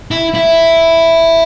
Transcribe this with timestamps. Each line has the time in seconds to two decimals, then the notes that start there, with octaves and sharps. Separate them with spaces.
0.11 E4
0.35 E4